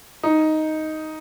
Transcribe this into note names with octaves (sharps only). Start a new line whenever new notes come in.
D#4